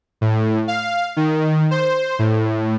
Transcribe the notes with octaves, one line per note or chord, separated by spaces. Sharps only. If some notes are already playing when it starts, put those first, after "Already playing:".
A2
F5
D#3
C5
A2